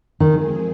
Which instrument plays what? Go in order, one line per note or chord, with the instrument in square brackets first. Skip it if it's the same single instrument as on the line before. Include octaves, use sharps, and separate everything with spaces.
[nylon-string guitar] D#3 [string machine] F3 G#3 C4 G#4